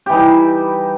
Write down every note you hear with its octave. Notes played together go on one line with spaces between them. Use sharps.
E3 G3 D#4 G4